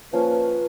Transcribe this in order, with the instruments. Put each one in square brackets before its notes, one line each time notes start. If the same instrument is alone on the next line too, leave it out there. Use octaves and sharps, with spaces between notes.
[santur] F3 A#3 C#4 [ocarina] B4